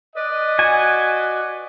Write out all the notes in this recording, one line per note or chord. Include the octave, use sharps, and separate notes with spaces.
B4 D5 D#5
F#4 G#5